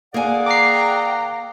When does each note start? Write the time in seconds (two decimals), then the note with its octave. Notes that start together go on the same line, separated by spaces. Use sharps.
0.14 A#3 G#4 D5 F#5 G#5
0.46 G5 A#5 D6 C7